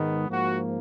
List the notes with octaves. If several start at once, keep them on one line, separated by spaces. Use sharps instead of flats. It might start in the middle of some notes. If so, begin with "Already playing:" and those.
Already playing: G#2 D#3 G#3 B3
G#2 F3 A#3 F#4